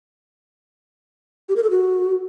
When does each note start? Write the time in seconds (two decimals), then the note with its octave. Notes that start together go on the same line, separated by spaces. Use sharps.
1.49 G4
1.56 A#4
1.63 A4
1.70 F#4